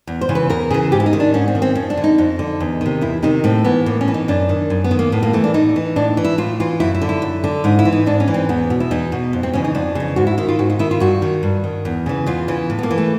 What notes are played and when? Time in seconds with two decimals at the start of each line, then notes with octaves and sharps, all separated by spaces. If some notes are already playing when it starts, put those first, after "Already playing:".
0.07 E2
0.21 C5
0.29 C#3 E3
0.35 B4
0.50 E2 A#4
0.70 C#3 E3 G#4
0.92 G#2 G4
1.00 E4
1.06 D#4
1.13 D#3
1.20 D4
1.34 G#2 C#4
1.48 C4
1.55 D#3
1.62 C4
1.75 F2 C#4
1.90 D4
1.97 D3
2.04 D#4
2.18 F2
2.39 D3
2.60 E2
2.81 C3 D#3
3.01 E2 E4
3.23 C3 D#3 D#4
3.44 A2 C4
3.64 E3 B3
3.86 A2 A#3
4.01 C#4
4.08 E3
4.14 D#4
4.28 F#2 D4
4.49 D#3
4.70 F#2
4.84 B3
4.91 D#3
4.99 A#3
5.12 A2 B3
5.23 A#3
5.33 E3 A3
5.44 D4
5.54 A2 D#4
5.76 E3
5.96 A2 D4
6.17 E3
6.24 E4
6.38 A2 F4
6.60 E3 F4
6.80 F#2 E4
6.95 E4
7.01 D3
7.09 E4
7.22 F#2
7.44 D3
7.64 G#2 D#4
7.79 E4
7.85 E3
7.93 D#4
8.06 G#2 D4
8.20 C#4
8.28 E3
8.34 C4
8.49 E2 B3
8.70 B2
8.80 E4
8.91 E2 D#4
9.12 B2
9.33 F2
9.43 C4
9.53 C#3 E3 C#4
9.64 D#4
9.75 F2 D4
9.95 C#3 E3
10.16 G#2 F#4
10.27 E4
10.38 D#3 E4
10.49 F4
10.59 G#2 F#4
10.70 D#4
10.79 D#3 E4
10.91 F4
11.00 G2 F#4
11.22 D#3
11.43 G2
11.64 D#3
11.85 E2
12.06 C#3 E3
12.26 E2 F4
12.48 C#3 E3
12.70 A2
12.79 B3
12.83 A#3
12.90 E3
12.98 A3